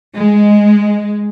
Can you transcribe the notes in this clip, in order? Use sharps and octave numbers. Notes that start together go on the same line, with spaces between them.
G#3